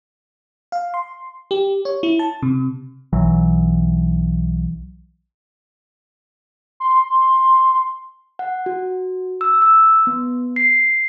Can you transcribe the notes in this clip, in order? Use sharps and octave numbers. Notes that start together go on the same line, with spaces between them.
F5
C6
G4
C#5
E4
A5
C3
B1 E3 F#3
C6
F#5
F#4
E6
E6
B3
C7